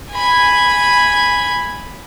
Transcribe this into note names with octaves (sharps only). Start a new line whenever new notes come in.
G#5 B5